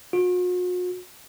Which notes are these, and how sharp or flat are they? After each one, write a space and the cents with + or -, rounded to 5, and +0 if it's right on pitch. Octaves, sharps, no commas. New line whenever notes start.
F#4 -45